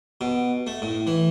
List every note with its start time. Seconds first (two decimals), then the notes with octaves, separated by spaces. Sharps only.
0.21 B2
0.67 A3
0.82 A2
1.07 E3